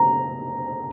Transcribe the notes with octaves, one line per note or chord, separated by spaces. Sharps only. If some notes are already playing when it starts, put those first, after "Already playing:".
Already playing: A#5